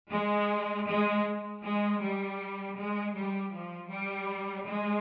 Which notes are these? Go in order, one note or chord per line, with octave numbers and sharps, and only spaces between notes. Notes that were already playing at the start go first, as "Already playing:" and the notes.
G#3
G#3
G#3
G3
G#3
G3
F3
G3
G#3